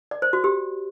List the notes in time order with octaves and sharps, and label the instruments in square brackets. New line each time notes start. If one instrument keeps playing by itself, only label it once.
[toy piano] D5
C5
F#4
G4